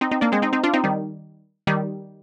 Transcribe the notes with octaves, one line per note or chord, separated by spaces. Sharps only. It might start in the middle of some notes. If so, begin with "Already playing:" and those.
C4 D#4
C4 D#4
A#3 D4
G#3 C4
C4 D#4
C4 D#4
D4 F4
C4 D#4
D#3 G3
D#3 G3